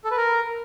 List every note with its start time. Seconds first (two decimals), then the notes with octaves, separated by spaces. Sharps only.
0.05 A4
0.11 B4
0.17 A#4